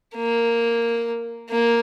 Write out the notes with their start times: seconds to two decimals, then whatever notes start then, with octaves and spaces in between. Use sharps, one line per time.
0.16 A#3
1.50 A#3